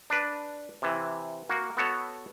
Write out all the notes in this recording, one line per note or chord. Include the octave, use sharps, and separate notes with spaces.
D4 B4
C3 E3
A#3 F#4
B3 F#4 A4 C#5